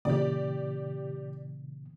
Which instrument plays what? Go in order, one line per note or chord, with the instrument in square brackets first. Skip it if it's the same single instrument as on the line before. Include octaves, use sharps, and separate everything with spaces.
[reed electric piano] A#2 C#3 E3 [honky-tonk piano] G4 D5